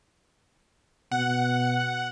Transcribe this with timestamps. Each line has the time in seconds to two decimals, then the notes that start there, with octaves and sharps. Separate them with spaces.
1.12 B2 F#5